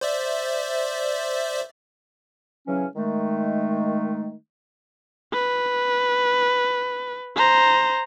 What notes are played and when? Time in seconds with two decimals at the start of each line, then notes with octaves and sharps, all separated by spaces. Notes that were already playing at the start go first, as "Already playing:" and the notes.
0.01 C5 D5 E5
2.67 C#3 E3 F#3 C#4
2.96 D#3 G#3 A3
5.33 B4
7.36 C5 A#5